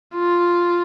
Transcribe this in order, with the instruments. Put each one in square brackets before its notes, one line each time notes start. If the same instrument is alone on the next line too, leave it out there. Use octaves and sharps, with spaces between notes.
[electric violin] F4